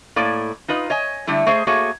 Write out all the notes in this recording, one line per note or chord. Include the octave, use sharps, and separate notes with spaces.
A2 A#3 D5
D#4 F4 B4 D#5
C#5 D#5 G#5
D3 G3 A3 E4
A3 G#4 C5 D#5
A3 A#3 F#4 G#4 C#5